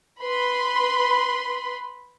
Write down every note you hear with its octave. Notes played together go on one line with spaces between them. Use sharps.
B4 B5 C6